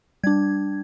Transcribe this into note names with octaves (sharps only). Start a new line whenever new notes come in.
G3 D4 G#6